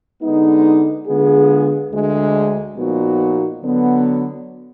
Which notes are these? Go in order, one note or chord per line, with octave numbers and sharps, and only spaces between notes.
D3 G#3 B3 D#4
D3 G#3 B3 F4 G#4
D2 D3 G#3
A#2 F3 B3 D#4 F#4
D3 F#3 B3